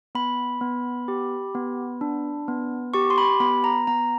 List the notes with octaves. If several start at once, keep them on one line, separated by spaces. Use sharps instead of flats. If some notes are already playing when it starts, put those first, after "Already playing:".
B3 B5
B3
G4
B3
D4
B3
G4 C#6
C6
B5
B3 B5
A#5
B3 A#5